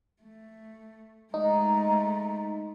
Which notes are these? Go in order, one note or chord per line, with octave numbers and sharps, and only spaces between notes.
A3
G#3 A3 D#4 A#5